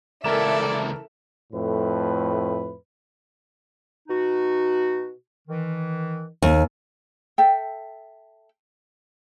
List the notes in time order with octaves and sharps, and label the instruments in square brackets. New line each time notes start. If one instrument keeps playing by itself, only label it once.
[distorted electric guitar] C#2 E3 [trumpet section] E4 D5 [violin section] A4 E5 [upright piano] A#4 E7
[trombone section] F2 A2 A3 B4
[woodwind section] B2 D#4 F#4
D#3 E3
[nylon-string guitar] D#2
[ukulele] A4 E5 G5